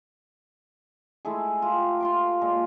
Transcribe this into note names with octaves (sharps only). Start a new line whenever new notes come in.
G#3 A3 E4 G#4
F4 G4
F4 C6 D6
A#2 G#3